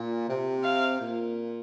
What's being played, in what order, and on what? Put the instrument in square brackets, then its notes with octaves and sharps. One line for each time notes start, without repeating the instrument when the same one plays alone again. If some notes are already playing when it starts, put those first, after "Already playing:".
Already playing: [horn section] A#2
C3
[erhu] F5
[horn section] A#2